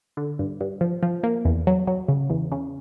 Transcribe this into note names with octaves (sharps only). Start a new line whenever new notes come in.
D3
G2
G2
F3
F3
A#3
E2
F#3
F#3
C#3
E2
C#3